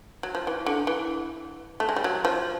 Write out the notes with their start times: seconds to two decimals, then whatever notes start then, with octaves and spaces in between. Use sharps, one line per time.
0.23 F#3
0.35 F3
0.47 E3
0.66 D3
0.87 E3
1.80 A3
1.89 G#3
1.96 G3
2.04 F#3
2.25 F3